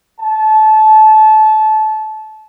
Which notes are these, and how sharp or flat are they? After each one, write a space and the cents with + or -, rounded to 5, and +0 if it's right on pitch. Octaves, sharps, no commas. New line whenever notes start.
A5 -25